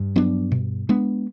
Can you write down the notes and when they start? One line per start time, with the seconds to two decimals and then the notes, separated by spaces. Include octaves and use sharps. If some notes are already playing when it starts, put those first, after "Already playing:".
Already playing: G2
0.16 F#3 B3 D4
0.52 B2
0.89 G#3 B3 D4